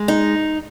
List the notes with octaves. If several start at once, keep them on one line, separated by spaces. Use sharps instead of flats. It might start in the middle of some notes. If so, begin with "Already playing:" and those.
Already playing: G#3
D#4